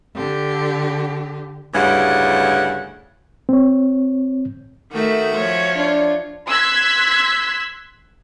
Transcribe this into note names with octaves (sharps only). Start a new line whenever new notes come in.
D3 G4
D2 G2 C#3 E4 F#5
C4 C#5
D#3 A3 F#4 E5
F3 C#5
D4 F4
C6 E6 F#6 G#6 B6